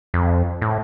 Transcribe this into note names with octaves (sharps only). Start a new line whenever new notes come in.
F2
A2